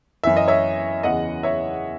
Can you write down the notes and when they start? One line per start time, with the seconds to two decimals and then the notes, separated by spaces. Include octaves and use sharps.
0.24 F#2 E3 E5
0.37 D#5
0.48 C#5 E5
1.03 E2 C#3 E3 D#5 F#5
1.43 C#5 E5